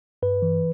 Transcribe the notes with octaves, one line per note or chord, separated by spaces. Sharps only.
G2 B4
E3